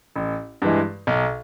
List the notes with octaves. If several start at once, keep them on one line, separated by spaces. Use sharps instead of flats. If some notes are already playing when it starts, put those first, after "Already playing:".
A1
G2 E3 G#3
B1